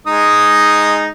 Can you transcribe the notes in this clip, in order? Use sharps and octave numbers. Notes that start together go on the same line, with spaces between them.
G#3 D#4 D#6